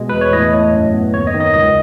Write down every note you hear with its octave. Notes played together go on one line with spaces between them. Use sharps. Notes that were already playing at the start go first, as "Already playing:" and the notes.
Already playing: B2 G#3
E2 B4
C#5
A2 D#5
A2
F#2
B3
D#2 C#5
D#5
D#3
D#5
C#2 D#5